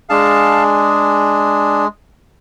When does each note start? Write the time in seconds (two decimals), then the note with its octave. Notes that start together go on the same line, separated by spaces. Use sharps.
0.09 G#3 D4 G#4 F5 A5